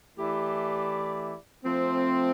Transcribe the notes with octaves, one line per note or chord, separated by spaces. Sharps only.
E3 A3 E4 G4 D5
F3 A3 C4